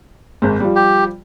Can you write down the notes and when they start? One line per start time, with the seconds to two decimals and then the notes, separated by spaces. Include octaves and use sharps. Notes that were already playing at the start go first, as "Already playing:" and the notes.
0.42 G#1 G#2
0.60 F3 G3
0.76 G4